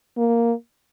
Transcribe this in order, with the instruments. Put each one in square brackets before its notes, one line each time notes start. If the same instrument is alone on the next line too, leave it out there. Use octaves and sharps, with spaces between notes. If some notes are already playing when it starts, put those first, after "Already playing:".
[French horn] A#3